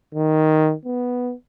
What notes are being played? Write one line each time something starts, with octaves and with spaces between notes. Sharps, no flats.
D#3
B3